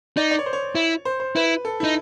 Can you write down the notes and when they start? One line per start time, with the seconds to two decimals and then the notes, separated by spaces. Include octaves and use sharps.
0.17 D#4 D5
0.31 D5
0.39 C#5
0.46 C5
0.53 C#5
0.75 E4
1.05 C5
1.20 C5
1.36 E4 B4
1.65 A4
1.80 D#4 E4